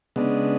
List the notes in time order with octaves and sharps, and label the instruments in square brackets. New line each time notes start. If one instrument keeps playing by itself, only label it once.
[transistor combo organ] C#3 G#3 B3 D4